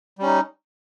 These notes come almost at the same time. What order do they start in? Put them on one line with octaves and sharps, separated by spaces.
G3 C#4 D#4